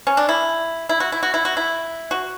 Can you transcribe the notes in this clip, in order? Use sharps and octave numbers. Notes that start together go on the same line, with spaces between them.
C#4
D4
E4
E4
F#4
E4
F#4
E4
F#4
E4
F#4